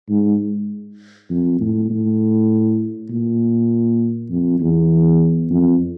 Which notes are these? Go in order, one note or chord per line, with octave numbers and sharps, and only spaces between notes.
G#2
F2
A2
A2
A#2
F2
E2
F2